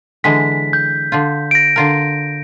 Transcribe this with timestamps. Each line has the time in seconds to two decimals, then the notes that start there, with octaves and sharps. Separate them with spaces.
0.24 D3 E3 G#3 B6
0.73 G6
1.12 D3 F4
1.51 A#6 D7
1.76 D3 F4 A#4